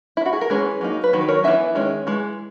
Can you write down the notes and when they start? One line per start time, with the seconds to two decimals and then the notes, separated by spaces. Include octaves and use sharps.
0.17 E4
0.26 F#4
0.33 G#4
0.41 A#4
0.50 E3 G#3 C#4 G#4 B4
0.81 F#3 A#3 D#4
1.04 B4
1.13 D#3 F#3
1.21 B4
1.28 A#4 C#5
1.44 E3 B3 D#4 E5 G#5
1.75 D#3 G#3 C#4
2.07 E3 G#3